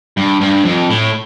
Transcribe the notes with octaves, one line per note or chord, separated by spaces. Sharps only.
G2
G2
F2
A2